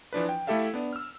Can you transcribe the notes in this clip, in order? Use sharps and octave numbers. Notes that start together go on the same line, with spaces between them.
E3 F3 D4 B4
G5
A3 E4 G4 A4 E5 F5
B3 D4
E6 F6